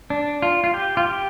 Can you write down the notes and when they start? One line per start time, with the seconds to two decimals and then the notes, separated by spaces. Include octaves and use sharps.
0.10 D4
0.42 F4
0.64 F4
0.74 G4
0.97 F4
1.06 G4